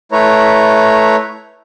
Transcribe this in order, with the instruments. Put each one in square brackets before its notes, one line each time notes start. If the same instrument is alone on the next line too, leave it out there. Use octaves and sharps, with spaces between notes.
[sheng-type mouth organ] A3 E4 B4 C#5 A#5